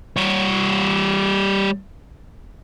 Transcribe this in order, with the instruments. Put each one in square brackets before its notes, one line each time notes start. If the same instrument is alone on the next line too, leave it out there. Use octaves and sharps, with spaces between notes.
[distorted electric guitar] G3 C#5